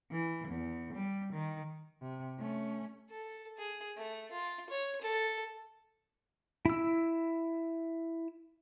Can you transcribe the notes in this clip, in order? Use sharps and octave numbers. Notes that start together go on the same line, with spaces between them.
E3
E2
G3
D#3
C3
A3 C#4
A4
G#4
A3
F4
C#5
A4
E4 E6